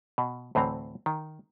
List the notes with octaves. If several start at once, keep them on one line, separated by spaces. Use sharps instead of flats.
B2
D2 A2 E3 C4 A#5
D#3